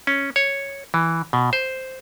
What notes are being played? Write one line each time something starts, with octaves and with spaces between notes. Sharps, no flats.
C#4
C#5
E3
B2
C5